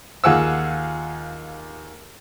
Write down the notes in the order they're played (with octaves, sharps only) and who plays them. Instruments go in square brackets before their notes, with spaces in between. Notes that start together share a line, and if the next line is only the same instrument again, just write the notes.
[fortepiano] D#2 F4 G#4 F#5 D6 E6